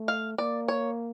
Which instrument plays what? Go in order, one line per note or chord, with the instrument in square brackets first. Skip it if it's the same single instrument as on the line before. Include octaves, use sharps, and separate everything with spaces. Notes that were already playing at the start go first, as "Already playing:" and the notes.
Already playing: [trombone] A3
[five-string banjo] F5
[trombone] A#3 [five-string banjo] D5
[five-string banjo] C#5